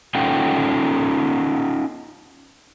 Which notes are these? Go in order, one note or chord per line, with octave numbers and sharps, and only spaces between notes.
C#4 D#4 F4 A4 F#5 G5